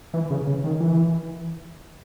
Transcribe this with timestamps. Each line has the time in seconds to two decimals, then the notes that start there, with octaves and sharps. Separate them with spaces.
0.14 E3
0.31 C#3
0.47 C#3
0.64 D#3
0.80 E3